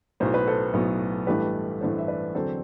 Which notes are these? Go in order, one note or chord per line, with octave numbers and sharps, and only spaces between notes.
B1 A2 F#3 B3 C5
B4
A4 C5
B1 A2 F#3 B3
A1 G2 E3 A3 G4 B4
A1 G2 E3 A3 A4 C5
E5
B4 D5
E2 D3 F#3 C4 A4 C5